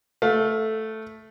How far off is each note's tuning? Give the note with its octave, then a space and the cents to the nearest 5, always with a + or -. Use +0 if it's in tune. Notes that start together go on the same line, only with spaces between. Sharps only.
A3 +0 F5 +25